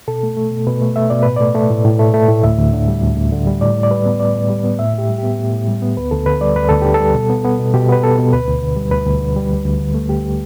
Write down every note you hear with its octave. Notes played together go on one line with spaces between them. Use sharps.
B2 A4
A3
A3
B2
B2 B4
A3
A3 E5
B2 D5
A2 B4
A3 D5
A3
A2
A2
A3
A3
A2
D2 E5
D2
D3
G3
D2
D2
D3
G3
A2 D5
A2
D5
G3 B4
B3
A2 D5
A2
G3
B3
A2 E5
A2 G4
G3
B3 G4
A2
A2
G3
B3
D2 B4
D2 A4
D3 B4
G3 D5
D2 B4
D2 A4
D3 G4
A4
G3
B2
B3
B3
B2
B2 G4
B3 B4
B3 A4
B2
D2 B4
D2
D3
G3
D2 B4
D2
D3
G3
D2
D2
D3
A3
D2 G4